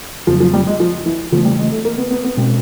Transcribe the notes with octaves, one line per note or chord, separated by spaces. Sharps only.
F2 C#3 F3 F#3
F3
G3
G#3
F3
E3
C#3 E3 F3 A3
G3
G#3
A3
A#3
B3
B3
B3
B2 G#3 C4 C#4